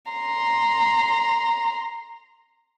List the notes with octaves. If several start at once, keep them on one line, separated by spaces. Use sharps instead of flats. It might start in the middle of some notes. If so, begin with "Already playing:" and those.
A#5 C6